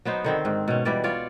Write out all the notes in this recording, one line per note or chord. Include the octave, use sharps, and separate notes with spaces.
F#3 B3 D#4 C5
D3 D#3 C4
G#2
B2 C#4
B2 E3 G3 D5
F4 C#5 D5